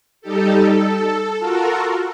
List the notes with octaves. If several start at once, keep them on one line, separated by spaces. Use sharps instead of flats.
G3 D#4 G4 A4
A4
F4 F#4 A4 A#4